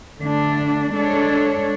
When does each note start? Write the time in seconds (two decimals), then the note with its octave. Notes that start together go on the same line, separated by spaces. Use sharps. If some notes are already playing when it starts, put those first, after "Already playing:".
0.19 D3 A3 D4
0.92 G#3 D4 A4 C#5